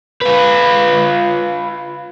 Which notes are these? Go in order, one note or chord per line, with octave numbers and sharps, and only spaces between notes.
F4 B4